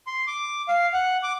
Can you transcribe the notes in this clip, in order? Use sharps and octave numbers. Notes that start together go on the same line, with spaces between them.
C6
D6
F5
F#5
D6